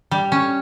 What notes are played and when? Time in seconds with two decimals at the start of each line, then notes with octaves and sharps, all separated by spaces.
0.11 G3
0.32 C#4